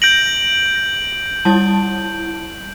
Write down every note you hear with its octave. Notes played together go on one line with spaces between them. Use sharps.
G6 A#6 D7 F#7
G3 E4 A5